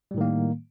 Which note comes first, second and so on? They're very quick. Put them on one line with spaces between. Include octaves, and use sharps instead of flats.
G3 A2 D#3 A#3